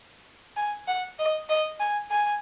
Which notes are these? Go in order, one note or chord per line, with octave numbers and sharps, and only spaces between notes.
G#5
F#5
D#5
D#5
G#5
G#5